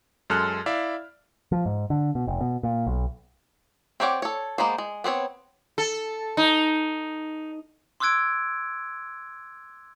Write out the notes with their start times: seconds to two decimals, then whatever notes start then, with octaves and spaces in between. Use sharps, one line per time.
0.30 F#2 G#3 A4 C6 F6 F#6
0.66 E4 D5 E5 F5
1.52 F3
1.66 G#2
1.90 D3
2.15 B2
2.27 F1
2.41 B2
2.63 A#2
2.86 B1
4.00 C4 G4 C#5 D5 F#5
4.22 A4 C#5
4.58 G#3 A#3 B3 C5
4.78 G#3
5.04 B3 C4 C5 C#5
5.78 A4
6.37 D#4
8.00 C6 D6 E6 F#6 G#6 D7